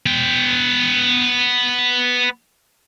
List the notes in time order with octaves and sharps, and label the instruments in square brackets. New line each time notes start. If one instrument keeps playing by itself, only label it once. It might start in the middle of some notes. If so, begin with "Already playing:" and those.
[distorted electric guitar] B3 G5